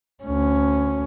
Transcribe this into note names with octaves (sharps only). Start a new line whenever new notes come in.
D2 C#4